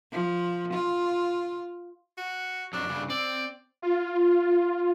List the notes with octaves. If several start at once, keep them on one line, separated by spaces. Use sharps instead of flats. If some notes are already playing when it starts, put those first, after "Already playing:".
F3
F4
F#4
F2 F#3 D4
G2 C#3
C4 D5
F4